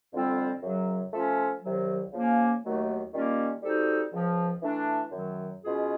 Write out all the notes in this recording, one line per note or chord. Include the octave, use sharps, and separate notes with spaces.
F2 D3 G3 C4 F4
F#2 C#3 F#3
F3 A3 C#4 F4 A4
C2 C3 D#3 F#3
C#3 F3 A#3 C#4
D#2 D#3 F#3 A3
D#3 G3 A#3 C#4 F4
G3 C4 D#4 F#4 A4
C#2 C#3 F3
E3 A3 D4
F#2 D#3 F#3
B2 G#3 C#4 F4 G#4